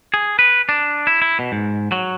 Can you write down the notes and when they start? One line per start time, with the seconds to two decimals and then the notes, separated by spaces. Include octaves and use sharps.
0.14 G#4
0.39 B4
0.69 D4
1.07 E4
1.22 E4
1.39 B2
1.52 G#2
1.92 F#3